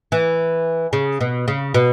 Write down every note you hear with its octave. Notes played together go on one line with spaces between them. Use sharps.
E3
C#3
B2
C#3
B2